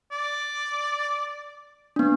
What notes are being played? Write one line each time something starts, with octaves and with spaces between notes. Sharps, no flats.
D5
B3 D4